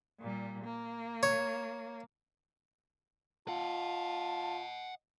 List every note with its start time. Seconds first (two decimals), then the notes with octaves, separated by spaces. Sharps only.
0.20 A#2 G3
0.64 A#3
1.23 C#5
3.48 F4 D#5 F#5 A5